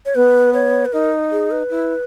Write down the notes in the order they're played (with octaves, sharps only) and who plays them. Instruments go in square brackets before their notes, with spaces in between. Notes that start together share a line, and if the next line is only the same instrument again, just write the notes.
[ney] C#5
[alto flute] B3 [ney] B4
[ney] C#5
B4
[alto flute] D#4 [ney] A#4
[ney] G#4
B4
[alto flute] E4